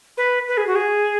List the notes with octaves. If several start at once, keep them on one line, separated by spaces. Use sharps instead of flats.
B4
B4
G#4
F#4
G#4